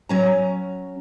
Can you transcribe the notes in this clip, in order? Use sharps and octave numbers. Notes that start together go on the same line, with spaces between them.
F#3 C#4 A#5